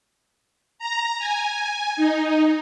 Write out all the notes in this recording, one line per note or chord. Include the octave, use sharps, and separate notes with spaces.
A#5
G#5
D#4